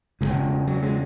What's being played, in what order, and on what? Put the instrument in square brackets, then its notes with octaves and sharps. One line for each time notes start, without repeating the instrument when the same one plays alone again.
[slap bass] E1 E2 C#3 G#3
F#3
G#3